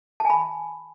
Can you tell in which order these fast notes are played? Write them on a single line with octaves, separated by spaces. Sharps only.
A5 G#5 B5